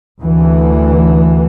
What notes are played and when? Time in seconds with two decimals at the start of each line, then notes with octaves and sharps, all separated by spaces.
0.21 D2 E3